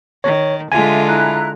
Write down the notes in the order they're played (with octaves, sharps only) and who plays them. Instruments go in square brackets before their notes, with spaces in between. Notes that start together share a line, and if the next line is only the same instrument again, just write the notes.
[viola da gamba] D#3 [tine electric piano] C#5
[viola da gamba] D3 G#3 F4 [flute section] E5 [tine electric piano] G#5
[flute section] E4 A#5 F#6